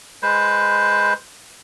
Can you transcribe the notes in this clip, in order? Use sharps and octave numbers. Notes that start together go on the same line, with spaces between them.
G#3 B4 C5